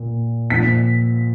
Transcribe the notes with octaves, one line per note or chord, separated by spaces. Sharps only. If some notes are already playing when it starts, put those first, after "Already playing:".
Already playing: A#2
A#2 F3 B6